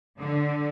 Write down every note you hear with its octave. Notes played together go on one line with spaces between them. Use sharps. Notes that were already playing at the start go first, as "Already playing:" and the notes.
D3